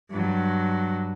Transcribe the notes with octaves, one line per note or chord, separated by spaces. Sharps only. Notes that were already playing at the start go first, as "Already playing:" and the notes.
G2 F#3